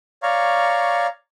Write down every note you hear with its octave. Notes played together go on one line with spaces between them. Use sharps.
C#5 D5 F5 A#5 C#6